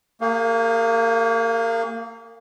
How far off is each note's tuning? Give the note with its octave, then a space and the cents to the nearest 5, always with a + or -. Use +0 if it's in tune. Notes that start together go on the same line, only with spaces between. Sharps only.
A#3 -30 G#4 -45 F5 +20